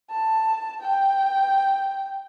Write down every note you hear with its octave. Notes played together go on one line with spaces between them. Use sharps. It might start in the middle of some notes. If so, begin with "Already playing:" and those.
A5
G5